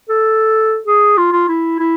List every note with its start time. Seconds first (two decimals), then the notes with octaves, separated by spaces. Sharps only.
0.09 A4
0.87 G#4
1.17 F4
1.32 F4
1.48 E4
1.79 E4